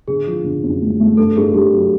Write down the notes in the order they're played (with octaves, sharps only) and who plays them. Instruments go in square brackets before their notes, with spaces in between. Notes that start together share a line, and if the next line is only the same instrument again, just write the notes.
[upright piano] D3 [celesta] G#4
[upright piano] F3
D3
F#2
A3
A3
[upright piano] G2 [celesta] A4
[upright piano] G2 [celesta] G#4
[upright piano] G2 [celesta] G4
[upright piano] F#3